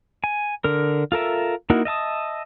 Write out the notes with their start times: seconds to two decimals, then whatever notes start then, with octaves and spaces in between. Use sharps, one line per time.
0.24 G#5
0.64 D3 A#4
1.12 F4 A4 A#4 E5
1.70 A#3 D#4 E4 F#4 A#4
1.85 D#5 E5 A5 D#6